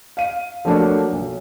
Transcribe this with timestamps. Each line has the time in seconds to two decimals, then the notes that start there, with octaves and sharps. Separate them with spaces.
0.17 F5 D#7
0.65 F3 F#3 A3 A#3 D4 F#4
1.12 B1